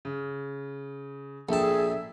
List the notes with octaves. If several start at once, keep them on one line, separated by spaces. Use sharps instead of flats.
C#3
A#1 G#4 A4 E5 G5 A5